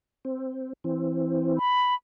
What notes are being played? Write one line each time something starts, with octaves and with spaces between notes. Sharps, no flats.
C4
E3 C4
B5